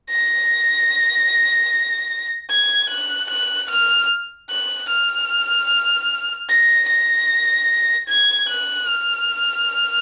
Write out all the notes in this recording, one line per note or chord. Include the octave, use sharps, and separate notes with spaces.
A#6
G#6
F#6
F#6
F6
F#6
F6
A#6
A#6
G#6
F#6
F6